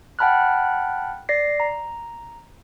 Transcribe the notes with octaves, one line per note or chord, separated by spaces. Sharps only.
F#5 G5 A5 B5 F6 F#6
D5 A#6 C7
A#5